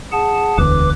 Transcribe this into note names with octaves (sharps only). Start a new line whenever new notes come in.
G#4 F#5 A5
E1 D2 B4 D6